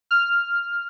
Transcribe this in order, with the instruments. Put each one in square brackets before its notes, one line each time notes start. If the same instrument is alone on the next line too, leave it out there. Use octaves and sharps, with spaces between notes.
[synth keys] F6